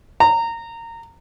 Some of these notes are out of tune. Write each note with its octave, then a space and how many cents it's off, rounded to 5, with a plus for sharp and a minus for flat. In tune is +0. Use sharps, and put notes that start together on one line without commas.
A#5 -20